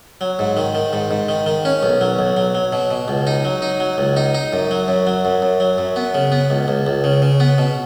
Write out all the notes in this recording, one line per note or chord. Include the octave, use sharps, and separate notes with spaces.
F#3
G#2
D#3
D#3
G#2
G#2
D#3
D#3
C#4
B1
F#3
B1
F#3
F#3
B2
B2
C#2
D#4
F#3
D#4
F#3
C#2
D#4
D#4
F#2
F#3
F#2
F#3
F#2
F#2
F#3
F#2
B3
C#3
B3
C#2
C#2
C#2
C#3
C#3
B3
B2